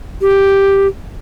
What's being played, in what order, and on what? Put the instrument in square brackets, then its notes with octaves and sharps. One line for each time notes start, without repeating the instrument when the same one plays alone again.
[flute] G4